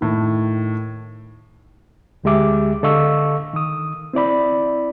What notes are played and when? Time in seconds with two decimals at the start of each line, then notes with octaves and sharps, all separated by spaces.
0.01 A2 D#3
2.24 D2 D3 G#3 G4 E5 D6
2.83 D3 A4 D#5 F5 C#6 E6
3.53 D#3 D#6
4.13 C4 E4 D5 B5